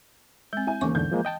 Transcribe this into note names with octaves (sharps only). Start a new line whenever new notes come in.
G#3 C4 G6
E4 G#5
D#2 C#3 E3 A#3 C#6 D6
E2 G#2 D3 G6
F3 G#3 A#3
D#5 G5 A5